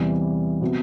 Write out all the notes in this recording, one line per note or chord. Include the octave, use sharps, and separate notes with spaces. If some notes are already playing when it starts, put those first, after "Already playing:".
Already playing: E2 C3 E3 G3
C3 F#3 B3